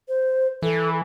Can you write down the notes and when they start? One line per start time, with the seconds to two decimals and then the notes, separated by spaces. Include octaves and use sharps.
0.09 C5
0.62 E3 A4